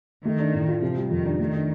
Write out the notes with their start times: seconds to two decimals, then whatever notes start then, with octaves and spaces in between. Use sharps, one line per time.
0.24 D#3 A3
0.39 D4
0.54 A2
0.68 F4
0.82 C3 F3
0.97 G3
1.11 F2 D#3
1.26 D4
1.40 D#3 A3
1.55 D4